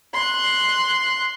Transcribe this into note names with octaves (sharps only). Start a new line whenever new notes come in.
C6 F#6